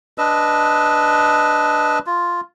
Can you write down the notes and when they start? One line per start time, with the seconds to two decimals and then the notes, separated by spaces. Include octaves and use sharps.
0.18 D4 B4 D#5 E6
2.06 F4